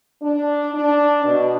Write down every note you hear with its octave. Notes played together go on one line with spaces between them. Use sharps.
D4
D4
B2